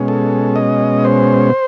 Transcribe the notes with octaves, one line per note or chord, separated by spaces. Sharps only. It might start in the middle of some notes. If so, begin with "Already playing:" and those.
Already playing: B2 G#3 C#4
A4
D#5
C5